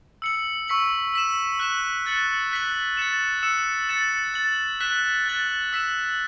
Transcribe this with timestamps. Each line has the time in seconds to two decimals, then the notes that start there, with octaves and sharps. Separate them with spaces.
0.22 E6 C#7 F#7
0.68 C#6 E6 B6 F#7
1.14 E6 B6 E7
1.60 F#6 B6 E7
2.06 F#6 A6 C#7 F#7
2.51 F#6 B6 F#7
2.97 A6 C#7 E7
3.43 E6 C#7 E7
3.89 A6 C#7 E7
4.34 A6 F#7
4.80 F#6 B6 E7
5.26 F#6 A6 F#7
5.73 E6 B6 E7